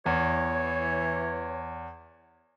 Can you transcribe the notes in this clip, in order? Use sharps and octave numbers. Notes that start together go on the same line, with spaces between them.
E2 E3 C#5